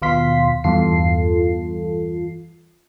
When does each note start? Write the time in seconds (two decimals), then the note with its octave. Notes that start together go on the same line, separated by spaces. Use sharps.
0.02 D#2 B2 F4 F5 C6 B6
0.64 E2 G2 F4 A4 C7